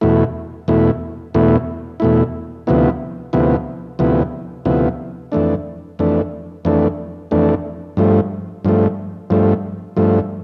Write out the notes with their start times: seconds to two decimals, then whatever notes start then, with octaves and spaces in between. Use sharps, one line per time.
0.01 E2 B2 A3 E4
0.68 E2 B2 A3 E4
1.34 E2 B2 A3 E4
2.00 E2 B2 A3 E4
2.67 D2 C3 F3 B3 E4
3.33 D2 C3 F3 B3 E4
3.99 D2 C3 F3 B3 E4
4.65 D2 C3 F3 B3 E4
5.32 F2 E3 A3 D4
5.99 F2 E3 A3 D4
6.65 F2 E3 A3 D4
7.31 F2 E3 A3 D4
7.97 G2 F3 A3
8.65 G2 F3 A3
9.30 G2 F3 A3
9.97 G2 F3 A3